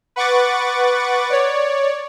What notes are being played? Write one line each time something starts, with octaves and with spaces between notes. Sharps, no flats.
B4 F#5 C#6 D6 A6
C#5 D5